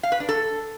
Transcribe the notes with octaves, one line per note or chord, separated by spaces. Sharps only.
F5
B4
D4
A4